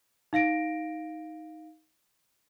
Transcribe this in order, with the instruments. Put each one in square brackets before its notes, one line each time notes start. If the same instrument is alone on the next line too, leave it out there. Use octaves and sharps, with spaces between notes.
[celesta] D#4 F5 A#6 D7